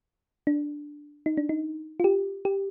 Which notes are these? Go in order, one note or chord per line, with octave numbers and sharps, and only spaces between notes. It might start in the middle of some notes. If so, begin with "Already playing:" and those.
D4
D#4
D4
D#4
F4
G4
G4